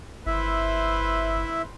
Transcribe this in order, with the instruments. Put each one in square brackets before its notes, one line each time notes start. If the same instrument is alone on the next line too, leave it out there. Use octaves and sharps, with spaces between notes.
[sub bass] G1 [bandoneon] E4 E5 [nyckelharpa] B4 C5